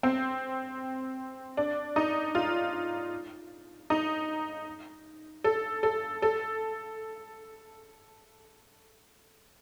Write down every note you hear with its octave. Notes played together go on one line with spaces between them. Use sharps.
C4
D4
D#4
F4
D#4
A4
A4
A4